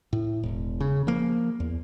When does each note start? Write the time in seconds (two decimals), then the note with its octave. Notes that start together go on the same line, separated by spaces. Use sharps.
0.13 A2
0.43 E1
0.80 C#3
1.07 F3 A#3
1.60 E2